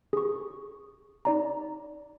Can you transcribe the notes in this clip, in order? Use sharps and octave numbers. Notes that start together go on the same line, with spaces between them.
G#4 C#6
D#4 D5 A#5